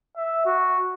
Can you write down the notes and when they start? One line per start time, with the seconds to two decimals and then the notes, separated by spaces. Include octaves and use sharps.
0.16 E5
0.46 F#4